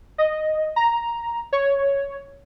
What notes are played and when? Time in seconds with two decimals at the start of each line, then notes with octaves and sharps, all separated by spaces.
0.18 D#5
0.76 A#5
1.53 C#5